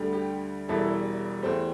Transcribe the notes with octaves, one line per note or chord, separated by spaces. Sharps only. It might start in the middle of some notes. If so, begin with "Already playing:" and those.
Already playing: D2 D3 G3
G4
E1 E2 E3 G3 E4 A4
E2 E3 A3 G4 C5